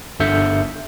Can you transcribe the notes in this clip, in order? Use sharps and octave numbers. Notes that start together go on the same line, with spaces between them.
G1 D3 E5 G6 C#7